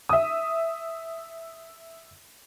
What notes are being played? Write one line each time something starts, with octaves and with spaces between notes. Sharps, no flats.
E5 D#6